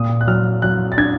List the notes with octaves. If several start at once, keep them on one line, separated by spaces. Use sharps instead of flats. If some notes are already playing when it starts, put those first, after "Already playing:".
Already playing: A#2 D#6
F#6
F#3 F6
F#3 F#6
A6
D4 G#6